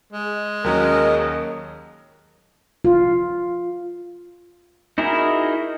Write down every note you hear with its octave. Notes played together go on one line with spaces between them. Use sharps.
G#3
D#2 F#3 C#4 A#4 D#5
F4
D#4 E4 F#4 G#4 A#4